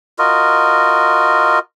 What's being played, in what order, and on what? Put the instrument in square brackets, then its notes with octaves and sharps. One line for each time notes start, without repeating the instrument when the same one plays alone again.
[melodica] F4 F#4 A#4 D#5